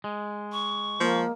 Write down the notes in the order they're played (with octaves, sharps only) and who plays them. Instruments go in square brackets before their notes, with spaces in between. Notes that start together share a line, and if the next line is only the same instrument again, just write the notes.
[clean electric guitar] G#3
[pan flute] C#6
[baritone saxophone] F3 [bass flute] A#3